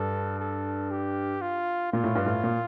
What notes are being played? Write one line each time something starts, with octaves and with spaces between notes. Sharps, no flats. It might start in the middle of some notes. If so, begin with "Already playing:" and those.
Already playing: G2 A4
A4
G4
F4
A#2 F4
A2
G2
A2
A#2